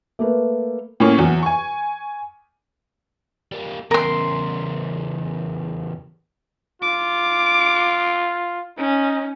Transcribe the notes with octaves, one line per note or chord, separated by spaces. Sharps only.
A3 A#3 B4
A2 A#3 C#4 C#6
E2 F#3
G#5 C#6
G3 A#3
E2 C#3 A#4 C6
F4 D6
C#4 D#4